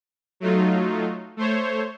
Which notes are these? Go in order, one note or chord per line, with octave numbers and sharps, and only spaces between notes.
F#3 A3 D#4 F4
A3 C5 C#5